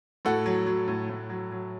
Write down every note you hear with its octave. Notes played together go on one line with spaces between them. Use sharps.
A2 F#4 A4
F#3
F#3
A2
A2
F#3
F#3